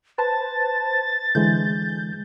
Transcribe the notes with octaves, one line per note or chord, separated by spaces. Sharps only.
B4 C5 A5 A6
D3 E3 G#3 G6